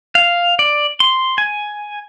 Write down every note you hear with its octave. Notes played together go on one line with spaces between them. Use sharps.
F5
D5
C6
G#5